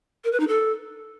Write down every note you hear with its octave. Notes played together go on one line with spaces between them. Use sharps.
A#4
B4
D#4
A4